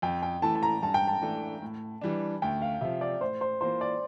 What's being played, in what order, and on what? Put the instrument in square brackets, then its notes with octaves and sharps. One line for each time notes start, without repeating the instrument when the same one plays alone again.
[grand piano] F2 [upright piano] G5
[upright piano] G5
[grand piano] E3 A3 E4 [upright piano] A5
[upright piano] A5
A#5
[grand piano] G2 [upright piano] A5
[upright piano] G5
A5
[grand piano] E3 A3 D4
A2
E3 G3 D4
[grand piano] D2 [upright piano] G5
[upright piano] F5
[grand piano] C3 F3 [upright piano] E5
[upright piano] D5
[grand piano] A2 [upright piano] C5
[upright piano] C5
[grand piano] E3 A#3 F4 [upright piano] C5
[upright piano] D5